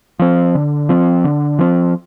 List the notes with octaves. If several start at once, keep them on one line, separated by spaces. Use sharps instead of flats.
F3 C4
D3
F3 C4
D3
F3 C4